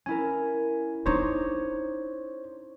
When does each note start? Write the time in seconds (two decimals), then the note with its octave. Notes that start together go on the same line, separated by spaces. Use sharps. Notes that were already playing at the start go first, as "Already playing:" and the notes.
0.06 C#4 E4 A#4 G#5
1.06 D4 D#4 C5 C#5 A#5 D6 D#6